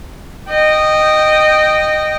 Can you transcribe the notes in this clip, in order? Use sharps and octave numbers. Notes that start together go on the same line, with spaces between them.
D#5 G5